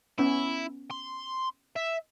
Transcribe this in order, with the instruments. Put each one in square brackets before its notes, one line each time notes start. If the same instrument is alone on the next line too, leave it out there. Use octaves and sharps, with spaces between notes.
[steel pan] B3 C#4 [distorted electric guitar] E4
[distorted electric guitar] C6
E5